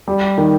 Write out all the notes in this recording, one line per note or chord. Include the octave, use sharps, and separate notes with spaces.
G3
D#3